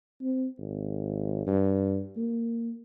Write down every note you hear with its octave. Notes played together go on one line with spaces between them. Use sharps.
C4
G#1
G2
A#3